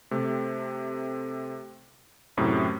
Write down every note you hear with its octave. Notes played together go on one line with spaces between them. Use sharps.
C3 A3
F#2 A2 C3